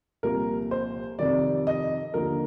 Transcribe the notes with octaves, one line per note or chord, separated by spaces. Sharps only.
C2 A#2 F3 A#4
C5
F2 C3 D#3 D5
D#5
D#2 D3 F3 A#4